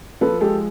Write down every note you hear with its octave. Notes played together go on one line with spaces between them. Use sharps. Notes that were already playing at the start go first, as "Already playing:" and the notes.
F3 A4 B4
G#3 G4 A4